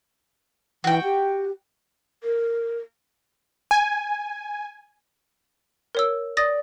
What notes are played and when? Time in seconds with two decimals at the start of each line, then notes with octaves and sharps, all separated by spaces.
0.84 E3 F#4 G5
1.04 G4
2.22 A#4
3.71 G#5
5.95 A#4 C#5 E6
6.37 D5 D#6 A6 A#6